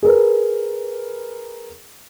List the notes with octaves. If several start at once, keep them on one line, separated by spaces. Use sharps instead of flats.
G#4 A#4 B4